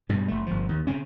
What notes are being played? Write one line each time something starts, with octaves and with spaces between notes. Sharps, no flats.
G2 B2 G3
F#1 A3
G1 F3
D#2
C#3 C4 C#4